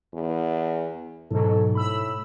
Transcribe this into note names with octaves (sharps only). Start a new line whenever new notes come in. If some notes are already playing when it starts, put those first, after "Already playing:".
E2
G#2 B2 F#3 A4
A2 B5 E6